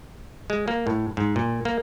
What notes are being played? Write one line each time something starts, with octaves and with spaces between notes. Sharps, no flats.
G#3
A#3
A2
G#2
A#2
A#3